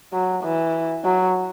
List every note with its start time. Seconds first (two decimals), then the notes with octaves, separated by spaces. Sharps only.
0.13 F#3
0.44 E3
1.04 F#3